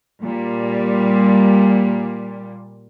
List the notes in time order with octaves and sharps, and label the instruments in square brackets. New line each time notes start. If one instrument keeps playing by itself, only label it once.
[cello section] A#2 G3